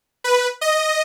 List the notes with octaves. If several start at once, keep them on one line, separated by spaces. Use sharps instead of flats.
B4
D#5